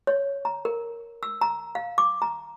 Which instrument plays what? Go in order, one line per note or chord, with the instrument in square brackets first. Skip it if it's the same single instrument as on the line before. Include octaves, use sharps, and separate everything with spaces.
[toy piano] C#5
A#5
A#4
E6
A#5
F5
D6
A#5